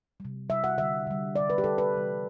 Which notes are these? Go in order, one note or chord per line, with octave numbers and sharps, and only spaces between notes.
C3 G3
C3 G3 E5
F#5
D3 G3 E5
D3 G3
D3 G3 D5
B4
G4
D3 G3 A4
B4
C3 E3 G3